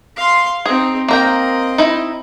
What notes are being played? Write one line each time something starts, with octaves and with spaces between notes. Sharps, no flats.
F5 C6
C4 D#4 G#4
A#3 C4 A#4 D#5 G5
D#4 E4